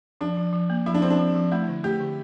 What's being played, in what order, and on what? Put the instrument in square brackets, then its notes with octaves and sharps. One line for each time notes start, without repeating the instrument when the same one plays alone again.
[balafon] F3 [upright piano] D4
[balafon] F3
F3
A#3
[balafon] F3 [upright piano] E4
[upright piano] D4
[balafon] F3 [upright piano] C4
[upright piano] D4
[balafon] F3
F3
[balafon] A3 [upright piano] E4
[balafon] D3
[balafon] A3 [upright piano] G4
[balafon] D3